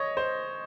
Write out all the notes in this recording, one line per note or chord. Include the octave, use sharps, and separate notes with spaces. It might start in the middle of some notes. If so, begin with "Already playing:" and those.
Already playing: C#5 D#5
C5